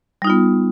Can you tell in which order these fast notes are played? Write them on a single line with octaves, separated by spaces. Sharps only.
G3 D#4 F4 B3